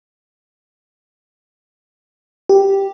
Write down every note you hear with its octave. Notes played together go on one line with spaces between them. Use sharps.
G4